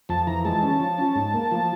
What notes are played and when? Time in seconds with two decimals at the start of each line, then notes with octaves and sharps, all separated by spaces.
0.09 F2 A5
0.27 E3 A#5
0.45 G#3 A5
0.63 C#4
0.80 F3
0.98 C#4
1.15 G#2
1.34 A#3
1.51 F3